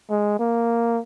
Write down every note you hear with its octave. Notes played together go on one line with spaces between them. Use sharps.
G#3
A#3